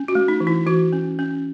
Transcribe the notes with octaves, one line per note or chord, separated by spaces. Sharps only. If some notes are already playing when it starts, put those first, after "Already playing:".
Already playing: C#4
F#4
A3
D#4
E3
E4
E3 F#4
C#4
C#4